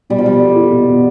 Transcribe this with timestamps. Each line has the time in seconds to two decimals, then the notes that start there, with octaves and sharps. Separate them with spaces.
0.10 B2 G3
0.19 F3
0.26 G3 B3
0.41 A4
0.56 F4
0.72 B2
0.87 B3